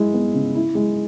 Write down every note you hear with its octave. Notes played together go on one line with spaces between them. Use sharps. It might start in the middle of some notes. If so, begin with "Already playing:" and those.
Already playing: G#3 E4
B3
C#3
E4
G#3